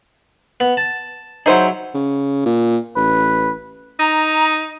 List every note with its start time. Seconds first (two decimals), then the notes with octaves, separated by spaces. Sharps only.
0.60 B3
0.77 A5
1.46 F#3 D#4 E4 G#4 C5
1.94 C#3
2.46 A#2
2.96 A1 B4
3.99 D#4 A#5